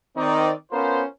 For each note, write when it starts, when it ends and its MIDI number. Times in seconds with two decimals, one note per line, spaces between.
0.17 0.50 51
0.17 0.50 60
0.17 0.50 63
0.17 0.50 74
0.72 1.03 59
0.72 1.03 61
0.72 1.03 65
0.72 1.03 70
0.72 1.03 72